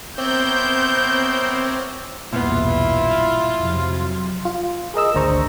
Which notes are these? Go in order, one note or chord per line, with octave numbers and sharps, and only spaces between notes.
B3 C4 A#4 C5 C#5 E5 D6 G6
B1 E2 G2 A#2 B3 E4 F4
F2 C3 F#3
F4
G#4 A#4 D#5 E6
G#1 D2 D4 C5 A#5 C#6